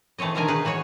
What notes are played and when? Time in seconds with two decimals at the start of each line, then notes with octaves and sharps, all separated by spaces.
0.18 E3 A3 C4 C#5 D#5
0.35 B2 D3 D#3 A#4 D#5 G#5
0.48 D#4 G#4 B4
0.65 E3 F#4 G#4 C#5